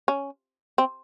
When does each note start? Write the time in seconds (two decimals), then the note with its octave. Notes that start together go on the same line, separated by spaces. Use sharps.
0.08 C#4
0.78 C4